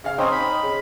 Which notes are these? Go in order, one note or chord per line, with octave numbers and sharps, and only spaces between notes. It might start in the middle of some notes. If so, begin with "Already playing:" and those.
C#3 F5 F6
C4 C#4 D#4 G5 D#6
B5
C#3